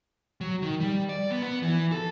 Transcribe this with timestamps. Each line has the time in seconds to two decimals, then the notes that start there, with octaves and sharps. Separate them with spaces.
0.41 F#3
0.62 D#3
0.80 G3
1.09 D5
1.31 B3
1.43 B3
1.63 E3
1.92 A4